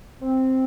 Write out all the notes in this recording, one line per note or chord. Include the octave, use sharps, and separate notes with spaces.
C4